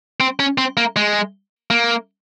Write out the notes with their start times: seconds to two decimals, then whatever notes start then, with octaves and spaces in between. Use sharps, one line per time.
0.20 C4
0.40 C#4
0.58 C4
0.77 A#3
0.96 G#3
1.70 A#3